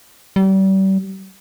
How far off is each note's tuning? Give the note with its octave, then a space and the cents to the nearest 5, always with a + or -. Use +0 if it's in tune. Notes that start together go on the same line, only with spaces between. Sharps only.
G3 -35